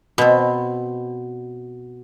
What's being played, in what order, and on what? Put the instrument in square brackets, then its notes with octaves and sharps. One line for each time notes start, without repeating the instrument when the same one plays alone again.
[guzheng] B2 C4